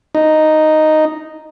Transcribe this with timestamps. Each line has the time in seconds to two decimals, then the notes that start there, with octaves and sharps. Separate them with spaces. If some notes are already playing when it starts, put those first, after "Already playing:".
0.15 D#4